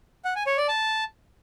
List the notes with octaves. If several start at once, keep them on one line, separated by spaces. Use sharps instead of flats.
F#5
G#5
C#5
D5
A5